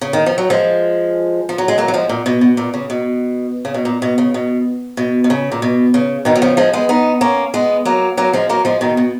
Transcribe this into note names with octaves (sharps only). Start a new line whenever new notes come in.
C#3
D#3
F3
F#3
F3 G#3
F3
F#3
G#3
F#3 A#3
F#3
F3 G#3
A#2
B2
B2
A#2
C#3
B2
C#3
B2
A#2
B2
C#3
B2
B2
B2
C#3
A#2
B2
C#3
B2 D#3
F#3
C#3 F3
F3 G#3
G#3 B3
B3 D#4
A#3 C#4
G#3 B3
F#3 A#3
F#3 A#3
F3 G#3
F#3 A#3
F3 G#3
B2 D#3
B2